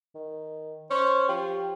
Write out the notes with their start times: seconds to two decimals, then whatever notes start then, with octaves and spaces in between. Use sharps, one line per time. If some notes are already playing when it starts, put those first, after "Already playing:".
0.15 D#3
0.90 C#4 C5
1.29 F3 G4